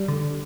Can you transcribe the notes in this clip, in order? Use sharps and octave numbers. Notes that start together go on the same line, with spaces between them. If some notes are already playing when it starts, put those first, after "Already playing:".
Already playing: G3
D3